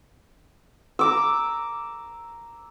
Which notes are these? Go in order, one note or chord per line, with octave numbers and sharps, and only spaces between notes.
A#5 D6 E6